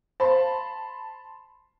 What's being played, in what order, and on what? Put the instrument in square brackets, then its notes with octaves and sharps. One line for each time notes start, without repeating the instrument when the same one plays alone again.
[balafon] C5 F5 [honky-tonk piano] A5 B5 C6